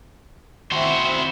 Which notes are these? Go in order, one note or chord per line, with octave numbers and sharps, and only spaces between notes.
C4 E4 F#4 C5 E5